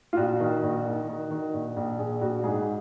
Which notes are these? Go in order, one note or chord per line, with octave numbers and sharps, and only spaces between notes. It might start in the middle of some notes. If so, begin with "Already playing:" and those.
F4
A#1 F#4
D#3
A#1
D#3
D#3
D#3
A#1
A#1
A#1 G#4
A#1 F#4
G#2 G#4